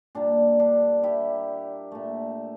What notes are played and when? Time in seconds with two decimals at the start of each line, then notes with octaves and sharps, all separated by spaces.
0.15 A#2 G3 A#3 D4
0.60 D4
1.03 E4 G4
1.92 A#2 A3